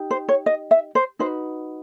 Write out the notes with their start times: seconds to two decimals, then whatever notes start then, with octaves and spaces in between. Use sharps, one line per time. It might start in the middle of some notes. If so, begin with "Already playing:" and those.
Already playing: D#4 G4
0.11 C5
0.28 C#5
0.46 D#5
0.71 E5
0.95 C5
1.19 D#4 F#4 B4 C5